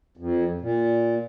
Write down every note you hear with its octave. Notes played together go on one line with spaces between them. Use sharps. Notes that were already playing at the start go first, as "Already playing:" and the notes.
F2
A#2